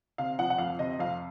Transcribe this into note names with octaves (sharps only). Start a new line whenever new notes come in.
C3 F5
F3 F#5
F#5
F2 F5
C3 D#5
F2 F5